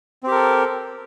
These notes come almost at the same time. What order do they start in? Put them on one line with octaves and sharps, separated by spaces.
C4 G4 A#4 A4